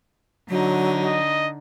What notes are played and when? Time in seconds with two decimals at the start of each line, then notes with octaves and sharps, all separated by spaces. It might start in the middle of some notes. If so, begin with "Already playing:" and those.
0.49 D3 F#3 D#4
1.05 D#5